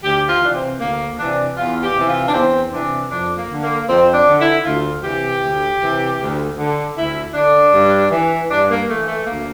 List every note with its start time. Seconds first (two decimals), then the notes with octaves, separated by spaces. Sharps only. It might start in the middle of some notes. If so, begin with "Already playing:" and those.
0.04 D2 G4
0.29 F4
0.42 C3 E3 D4
0.54 C4
0.80 D2 A#3
1.19 C3 E3 D4
1.57 E2 F4
1.82 G4
1.96 C3 E3
2.08 F4
2.28 D4
2.34 E2 C4
2.73 C3 E3 D4
3.11 F2 D4
3.36 A#3
3.50 D3
3.63 A#3
3.88 F2 C4
4.14 D4
4.27 D3
4.39 E4
4.65 D2 F4
5.04 C3 E3 G4
5.43 D2
5.80 C3 E3
6.19 D2
6.57 D3
6.96 D2 E4
7.34 D3 D4
7.73 G2
8.11 E3
8.50 G2 D4
8.70 A#3
8.88 E3 A3
9.08 A3
9.26 D2 A#3